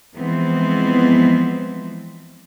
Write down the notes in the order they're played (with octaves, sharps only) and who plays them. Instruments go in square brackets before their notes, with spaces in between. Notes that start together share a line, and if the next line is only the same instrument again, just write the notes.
[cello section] E3 F3 G#3 B3 C4